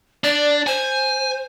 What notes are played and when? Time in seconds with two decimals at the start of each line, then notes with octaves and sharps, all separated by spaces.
0.24 D4 D5
0.67 C5 G#5